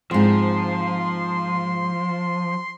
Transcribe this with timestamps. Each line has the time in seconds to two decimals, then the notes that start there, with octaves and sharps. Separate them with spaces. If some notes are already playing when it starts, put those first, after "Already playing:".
0.11 G#2 F3 C4 C6